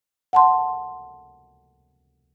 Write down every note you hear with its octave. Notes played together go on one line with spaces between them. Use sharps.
F#5 A5 C6